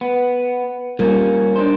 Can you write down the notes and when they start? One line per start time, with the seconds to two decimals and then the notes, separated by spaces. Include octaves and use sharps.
0.01 B3
0.99 F3 G3 A#3 C#4 A#4
1.56 D4 D#4 C5